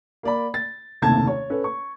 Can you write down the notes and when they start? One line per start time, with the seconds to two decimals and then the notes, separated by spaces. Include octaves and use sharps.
0.23 A#3 D5 B5
0.54 A6
1.02 F#1 D#2 C3 A3 A5 G#6
1.27 C#5
1.50 C#4 A4 B4
1.64 C#6